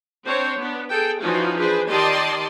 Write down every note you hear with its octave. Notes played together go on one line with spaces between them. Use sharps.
C4 D4 C5 C#5
B3 D4
G#4 A4 G5
E3 F3 C#4 D#4 F4 F#4
D4 G#4 B4 C5
D#3 G4 D5 D#5 A5 C6